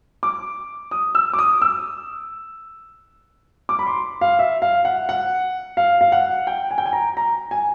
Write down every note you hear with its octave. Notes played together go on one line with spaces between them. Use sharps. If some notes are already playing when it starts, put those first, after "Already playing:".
D6
D#6
E6
D6
D#6
E6
D6
B5
C6
F5
E5
F5
F#5
F#5
F5
F5
F#5
G5
G#5
G5
G#5
A#5
A#5
G#5